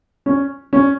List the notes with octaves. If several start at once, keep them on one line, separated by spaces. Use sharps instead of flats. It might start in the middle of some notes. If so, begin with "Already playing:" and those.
C#4
C#4